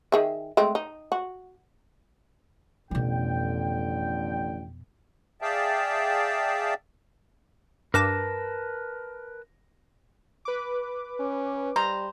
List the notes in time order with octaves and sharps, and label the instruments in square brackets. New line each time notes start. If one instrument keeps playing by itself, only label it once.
[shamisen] D#3 G#4 E5
G#3 A3 C4
D#4
F#4
[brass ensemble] A1 D3 G5 [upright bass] F2 B2
[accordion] G#4 D5 E5 F5 G5 A5
[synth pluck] G2 D6 E7 [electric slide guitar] A#4 B4 A5 [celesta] A#6
[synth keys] B4 D6
[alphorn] C#4
[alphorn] G3 [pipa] C5 [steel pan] A#5